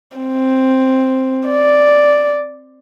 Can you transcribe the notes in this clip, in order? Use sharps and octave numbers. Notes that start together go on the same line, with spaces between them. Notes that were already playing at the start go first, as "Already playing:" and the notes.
C4
D5